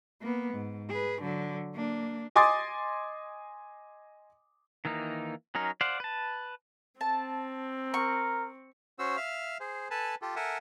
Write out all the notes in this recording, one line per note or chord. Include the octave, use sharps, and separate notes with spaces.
A#3 B3
G#2
G#4 B4
D3 F#3
A#3 D4
D#5 G#5 C6 D6 D#6 A6
D#3 E3 A#3 D#4
F#3 C#4 D#4 A#4
C5 D5 F5 F#5
B4 A5
C4 A5
A#4 C#6
C#4 F#4 C5 E6
E5 F5 F6
G#4 C5
A4 B4 G#5 A5
F4 G4 A4
A4 A#4 E5 F#5 G#5